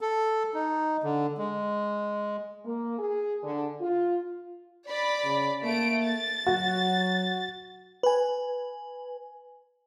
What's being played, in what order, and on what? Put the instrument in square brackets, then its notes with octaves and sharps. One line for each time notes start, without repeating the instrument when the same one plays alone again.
[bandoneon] A4
D#4
D3
G#3
[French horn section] A#3
G#4
D3
F4
[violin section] D5 B5
[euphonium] C#3
[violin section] A3 D7 [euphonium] A#3
[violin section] A6
[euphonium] F#3 [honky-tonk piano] F#4
[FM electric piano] B4 G#5